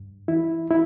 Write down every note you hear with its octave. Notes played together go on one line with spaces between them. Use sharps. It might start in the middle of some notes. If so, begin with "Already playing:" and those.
Already playing: G2
E3 E4
E4